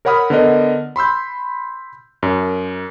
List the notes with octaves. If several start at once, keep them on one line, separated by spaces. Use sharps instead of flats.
A#4 C#5 F#5 B5 D#6 F6
D3 B3 A#4 D#5
B5 C6 E6 G6
F#2